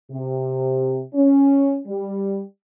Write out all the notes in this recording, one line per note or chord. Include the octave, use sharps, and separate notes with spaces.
C3
C#4
G3